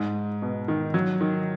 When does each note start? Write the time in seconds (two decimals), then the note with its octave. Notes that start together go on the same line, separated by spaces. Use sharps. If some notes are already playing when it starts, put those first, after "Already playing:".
Already playing: G#2
0.42 B2
0.68 D#3
0.94 F#3
1.21 D#3